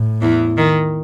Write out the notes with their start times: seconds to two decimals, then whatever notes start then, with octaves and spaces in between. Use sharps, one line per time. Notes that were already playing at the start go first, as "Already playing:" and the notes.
Already playing: A2
0.22 E2 E3
0.57 D#3